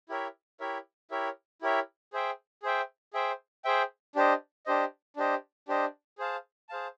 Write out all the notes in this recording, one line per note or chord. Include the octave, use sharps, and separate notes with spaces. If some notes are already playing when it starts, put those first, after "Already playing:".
E4 G4 A#4 C#5 E5
E4 G4 A#4 C#5 E5
E4 G4 A#4 C#5 E5
E4 G4 A#4 C#5 E5
G#4 C5 E5 G5
G#4 C5 E5 G5
G#4 C5 E5 G5
G#4 C5 E5 G5
D4 G4 C5 D#5
D4 G4 C5 D#5
D4 G4 C5 D#5
D4 G4 C5 D#5
G#4 C5 F5 A5
G#4 C5 F5 A5